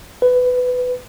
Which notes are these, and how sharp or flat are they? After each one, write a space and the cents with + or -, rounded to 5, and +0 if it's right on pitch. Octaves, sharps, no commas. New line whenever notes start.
B4 +15